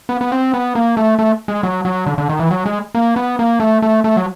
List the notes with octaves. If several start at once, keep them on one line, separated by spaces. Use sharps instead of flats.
B3
B3
C4
B3
A#3
A3
A3
G#3
F#3
F#3
D3
D3
D#3
E3
F#3
G#3
A#3
B3
A#3
A3
A3
A3
F#3